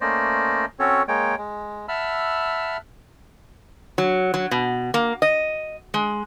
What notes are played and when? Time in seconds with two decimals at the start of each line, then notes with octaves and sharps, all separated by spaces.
0.01 A3 A#3 C#4 C5 D5 D#5
0.79 C4 C#4 F#4 A4 C#5
1.08 G#3 A#3 C#5 G5
1.37 G#3
1.88 E5 F#5 A5 B5 E6 F6
3.98 F#3
4.34 F#3
4.51 B2
4.94 A#3
5.22 D#5
5.94 G#3